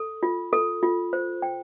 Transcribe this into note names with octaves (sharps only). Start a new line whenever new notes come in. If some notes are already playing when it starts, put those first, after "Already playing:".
Already playing: A4
F4
A4
F4
C5
G5